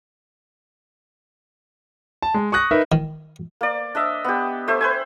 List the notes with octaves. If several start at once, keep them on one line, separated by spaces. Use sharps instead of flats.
A5
G#3
C#6 D#6 F#6 A#6
D#4 A#4 B4 E5
D#3
A#3 D5
D4 D#5 E5
B3 G4
A3 C5 E5
B4 C5 G#5